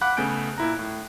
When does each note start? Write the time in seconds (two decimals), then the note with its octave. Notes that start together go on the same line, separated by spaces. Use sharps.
0.01 F5 F#5 B5 D6 F#6
0.17 C#3 A3 B3 G#5 G6 D7
0.58 A#2 E4 A#5
0.79 A2